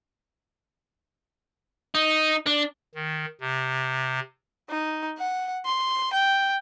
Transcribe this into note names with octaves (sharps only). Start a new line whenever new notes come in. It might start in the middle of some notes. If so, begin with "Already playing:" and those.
D#4
D4
D#3
C3
D#4
F#5
C6
G5